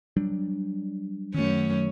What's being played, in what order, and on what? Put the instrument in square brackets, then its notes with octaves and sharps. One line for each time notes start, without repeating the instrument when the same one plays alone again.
[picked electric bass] F#3 G3 D4
[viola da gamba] F#2 C#4 [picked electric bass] D#3 A3